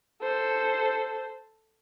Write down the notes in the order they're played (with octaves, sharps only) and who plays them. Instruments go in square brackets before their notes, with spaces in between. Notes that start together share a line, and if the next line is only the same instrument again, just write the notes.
[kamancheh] A4 C5